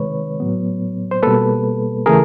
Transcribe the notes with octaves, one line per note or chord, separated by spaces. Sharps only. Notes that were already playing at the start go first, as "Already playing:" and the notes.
Already playing: C3 D#3 G#3 B4 C#5
A2 F#3 B3
C5
B2 G3 A#3 A4 B4
C#3 E3 A3 G#4 A#4